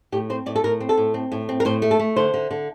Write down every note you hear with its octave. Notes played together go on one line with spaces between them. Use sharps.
A2 G4
C4 C5
A2 D5
A4
A2 A#4
C4
A4
A2
C4
A2
C4
A#4
A2 C5
A3
A4
A3
D3 C5
D3
D3